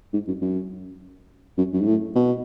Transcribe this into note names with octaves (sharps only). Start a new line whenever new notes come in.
G#2
F#2
F#2
F#2
F#2
G#2
A2
B2